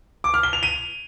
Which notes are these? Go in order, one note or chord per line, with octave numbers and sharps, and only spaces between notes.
D6
F6
G7
F7
D#7